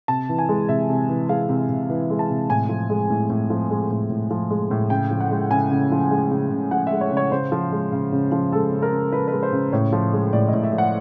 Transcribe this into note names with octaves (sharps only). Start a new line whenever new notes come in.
C3 A5
E3
G#5
G#3
C3 E5
C3
E3
G#3 F5
C3
C3
E3
G#3
A5
C3
A2 G#5
F3
G#3
A2
A2
F3
G#3
A2
A2
F3
G#3
A2
C#3 G5
F3
F#5
G#3
C#3 G#5
C#3
F3
G#3
C#3
C#3
F3 F#5
G#3 E5
C#5
C#3
C#5
C#3 C5
F3
G#3
C#3
C#3
F3
G#3 A4
C#3
A#4
C#3
F3 B4
G#3 B4
C5
C#3
A2 C#5
F3
G#3
A2 D5
A2 D#5
E5
F3
F#5